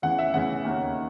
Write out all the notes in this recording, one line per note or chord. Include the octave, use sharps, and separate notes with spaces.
E2 C#3 E3 F#5
E5
E2 C#3 E3 F#5
D#2 D#3 A#3 C#4